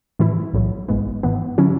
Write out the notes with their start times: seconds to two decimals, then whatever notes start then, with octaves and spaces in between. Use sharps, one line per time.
0.19 A2 E3 A3 E4
0.54 B1 A2 F#3
0.88 G#1 G#2 G#3 B3
1.23 G#2 E3 B3
1.58 D3 F#3 C#4 E4